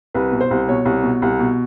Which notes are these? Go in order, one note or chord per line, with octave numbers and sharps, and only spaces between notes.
C2 B4
B2
C5
C2
B2 C#5
C2
B2
C2
B2